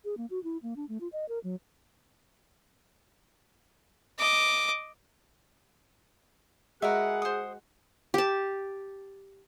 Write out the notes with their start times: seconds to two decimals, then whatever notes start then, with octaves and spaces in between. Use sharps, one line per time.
0.05 G#4
0.17 A#3
0.30 F#4
0.44 E4
0.63 A#3
0.76 D4
0.89 A3
1.01 F4
1.13 D#5
1.29 A#4
1.44 F#3
4.19 D#5 D6
6.82 G#3 F#4 G#4 A#4 B4 E5 F#5
7.22 C5 D#6
8.14 G4 A5